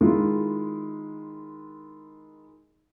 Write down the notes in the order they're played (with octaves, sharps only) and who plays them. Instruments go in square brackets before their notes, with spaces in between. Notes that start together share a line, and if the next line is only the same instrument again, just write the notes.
[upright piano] D#3 G#3 E4 F4